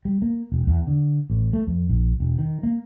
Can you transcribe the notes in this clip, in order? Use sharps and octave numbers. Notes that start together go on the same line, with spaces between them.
G3
A#3
E1
E2
D3
A1
A3
F2
A#1
E1
D#3
A#3